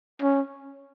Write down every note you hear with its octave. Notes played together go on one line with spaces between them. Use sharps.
C#4